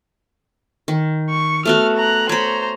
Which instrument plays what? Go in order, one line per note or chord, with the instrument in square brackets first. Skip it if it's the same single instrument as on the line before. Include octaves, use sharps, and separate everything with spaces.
[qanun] D#3
[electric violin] C#6
[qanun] A3 B3 F#4 [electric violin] F6
[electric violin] A#5 F#6
[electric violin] C5 A#5 [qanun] C#5 B5